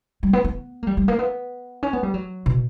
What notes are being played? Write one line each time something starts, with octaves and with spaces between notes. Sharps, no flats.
G3
B3
B3
A#3
G3
G3
A#3
B3
C#4
B3
G3
F#3
B2